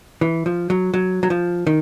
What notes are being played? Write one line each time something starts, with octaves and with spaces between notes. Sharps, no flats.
E3
F3
F#3
F#3
F#3
F3
D#3